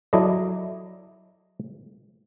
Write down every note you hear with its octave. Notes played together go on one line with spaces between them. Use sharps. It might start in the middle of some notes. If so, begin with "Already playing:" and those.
F#3 E4 A4 D5 D#5